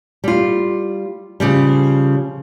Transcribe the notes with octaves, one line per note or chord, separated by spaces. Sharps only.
G3 F4
C#3 F3 G3